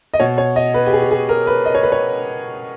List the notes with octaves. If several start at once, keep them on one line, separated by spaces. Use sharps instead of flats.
D#5
B2 C#5
C#5
D#5
B4
G4
G#4
G4
G#4
A#4
B4
D#5
C#5
B4
C#5